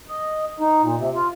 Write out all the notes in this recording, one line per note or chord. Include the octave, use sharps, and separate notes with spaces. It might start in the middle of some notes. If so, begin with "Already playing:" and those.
D#5
D#4
A#2
C3
F4